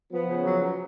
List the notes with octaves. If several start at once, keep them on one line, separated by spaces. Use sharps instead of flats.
F3 B3
C#3
F#3
F#3